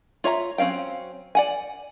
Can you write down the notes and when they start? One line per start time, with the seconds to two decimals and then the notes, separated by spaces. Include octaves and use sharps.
0.24 F4 C#5 E5 A#5
0.58 F#3 C4 C#4 F5 G5
1.35 D5 F#5 G#5